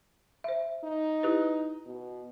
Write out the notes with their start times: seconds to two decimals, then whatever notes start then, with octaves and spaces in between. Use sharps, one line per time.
0.44 C5 E5
0.84 D#4
1.23 E4 G4 B4
1.86 B2